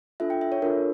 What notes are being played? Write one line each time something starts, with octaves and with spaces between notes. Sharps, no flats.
D4 F4 A4 E5
G5
E5
C#5
D4 F4 A4 A#4